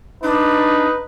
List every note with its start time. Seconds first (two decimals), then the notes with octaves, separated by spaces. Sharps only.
0.24 D4 D#4 B4